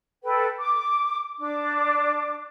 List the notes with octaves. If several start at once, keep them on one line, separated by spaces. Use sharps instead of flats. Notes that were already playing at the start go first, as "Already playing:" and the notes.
A4 B4 G5
D6
D4 D6